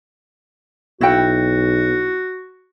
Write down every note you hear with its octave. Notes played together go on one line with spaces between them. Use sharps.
B1 E4 F#4 G5